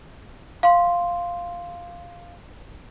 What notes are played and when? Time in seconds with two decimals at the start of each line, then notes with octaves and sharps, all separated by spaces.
0.63 F5 C6